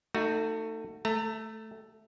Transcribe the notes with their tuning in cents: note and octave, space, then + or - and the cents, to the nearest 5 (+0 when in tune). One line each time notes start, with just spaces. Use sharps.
A3 +25 D#4 -10 F#4 +0
A3 +0 A#5 -35